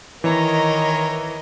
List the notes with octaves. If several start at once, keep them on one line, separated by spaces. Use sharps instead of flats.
D#3 E3 A#4 C#5 D#5 A#5